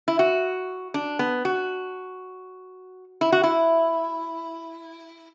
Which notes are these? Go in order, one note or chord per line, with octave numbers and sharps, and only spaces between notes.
E4
F#4
D4
B3
F#4
E4
F#4
E4